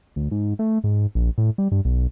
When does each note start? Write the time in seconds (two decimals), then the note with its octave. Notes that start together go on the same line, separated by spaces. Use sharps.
0.16 D2
0.31 G#2
0.59 A3
0.84 G#2
1.15 A#1
1.38 A2
1.58 G3
1.72 G2
1.85 B1